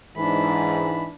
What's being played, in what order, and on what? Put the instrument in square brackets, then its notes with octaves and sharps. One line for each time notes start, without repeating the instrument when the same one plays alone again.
[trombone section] G#2 [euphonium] E3 [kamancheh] D4 B5